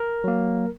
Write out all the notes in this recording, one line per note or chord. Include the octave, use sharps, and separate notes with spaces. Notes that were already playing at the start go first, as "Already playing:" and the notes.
Already playing: A#4
F#3 A#3